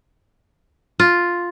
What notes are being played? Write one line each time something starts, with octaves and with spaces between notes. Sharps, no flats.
F4